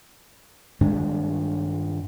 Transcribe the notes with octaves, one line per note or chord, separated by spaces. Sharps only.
G2 D#3 G#3 D4